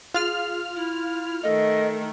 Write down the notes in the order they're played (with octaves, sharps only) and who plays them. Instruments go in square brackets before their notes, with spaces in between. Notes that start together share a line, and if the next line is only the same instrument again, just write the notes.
[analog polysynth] F4 F6 [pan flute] G#4
[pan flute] E4
[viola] D#3 A3 [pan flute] A4 [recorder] D#5